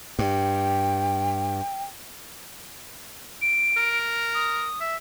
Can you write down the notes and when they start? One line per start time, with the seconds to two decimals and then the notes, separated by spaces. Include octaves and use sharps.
0.19 G2 G5
3.42 D7
3.77 A#4
4.35 D#6
4.80 E5